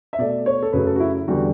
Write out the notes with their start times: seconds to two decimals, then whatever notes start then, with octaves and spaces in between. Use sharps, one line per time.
0.13 E5
0.18 B2 A3 D5
0.46 C#5
0.63 A4
0.73 F#2 C#3 F#3 A3 B4
0.87 A4
0.96 F#4
1.00 E4
1.28 E2 D3 G3 F#4